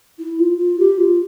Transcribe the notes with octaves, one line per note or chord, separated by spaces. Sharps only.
E4
F4
F4
G4
F4